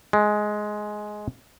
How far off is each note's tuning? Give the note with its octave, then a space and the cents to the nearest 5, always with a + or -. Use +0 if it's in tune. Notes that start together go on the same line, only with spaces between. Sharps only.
G#3 +10